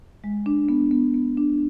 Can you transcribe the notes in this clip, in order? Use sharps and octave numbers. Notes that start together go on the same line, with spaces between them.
G#3
D4
B3
B3
B3
D4